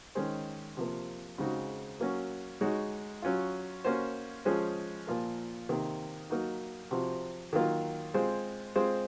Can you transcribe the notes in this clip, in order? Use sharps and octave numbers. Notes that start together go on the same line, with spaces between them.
D#3 G#3 C#4 G#4 C5
C3 F3 A#3
C#3 G#3 C4 D#4 F#4
F#3 A#3 C#4 F#4
G#3 D#4 F#4 C#5
F#3 C#4 F4
A#3 C#4 F#4 C5
F3 G#3 C#4 G#4 C5
A#2 F3 A#3 F4 A#4
C3 D#3 A#3
F#3 A#3 D#4 F#4
C3 F3 C4 F#4
D#3 F#3 A#3 F4
G#3 C4 F4 G#4 C5
G#3 C4 F4 G#4 C5